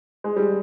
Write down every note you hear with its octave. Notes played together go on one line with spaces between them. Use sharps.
G#3
G3